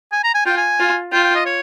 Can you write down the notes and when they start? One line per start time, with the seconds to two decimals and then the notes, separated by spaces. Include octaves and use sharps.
0.12 G#5
0.24 A#5
0.34 G#5
0.46 F4 G5
0.57 G#5
0.80 F4
1.12 F4 G5
1.24 G5
1.35 D#5
1.46 C#5